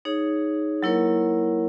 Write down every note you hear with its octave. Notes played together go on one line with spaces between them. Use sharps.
D#4 G#4 C#5
F#3 A#3 E4 A#4 C#5